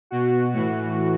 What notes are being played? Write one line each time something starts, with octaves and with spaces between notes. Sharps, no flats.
B2 F#4
A2 E3 F#4